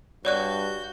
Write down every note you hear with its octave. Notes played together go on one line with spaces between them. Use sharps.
G2 F#4 C#5 D5 F#6 G6